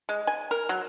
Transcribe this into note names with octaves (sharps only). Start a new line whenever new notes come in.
G#3
G#5
A#4
F#3